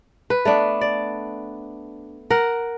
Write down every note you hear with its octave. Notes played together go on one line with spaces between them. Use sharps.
B4
A3 B3 D4
D5
A#4 F#5